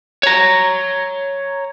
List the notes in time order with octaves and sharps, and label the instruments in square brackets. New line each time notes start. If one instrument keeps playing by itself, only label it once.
[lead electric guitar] C#5 A#5